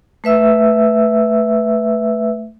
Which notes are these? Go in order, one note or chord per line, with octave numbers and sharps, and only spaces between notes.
A3 B4 E5 E6